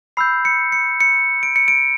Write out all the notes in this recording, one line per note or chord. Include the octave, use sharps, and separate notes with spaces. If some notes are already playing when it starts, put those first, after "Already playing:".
B5 E6 G6 C7
C#7
C#7
C#7
D7
C#7
D7